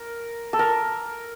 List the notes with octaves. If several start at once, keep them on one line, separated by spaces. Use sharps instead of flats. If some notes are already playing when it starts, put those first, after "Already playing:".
Already playing: A#4
A4
A#4